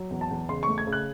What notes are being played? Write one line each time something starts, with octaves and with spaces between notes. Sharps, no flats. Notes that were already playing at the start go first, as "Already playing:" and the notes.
Already playing: F#3
E2
A5
E2
C#3 C6
A3 C#6
G#6
C#3
F#6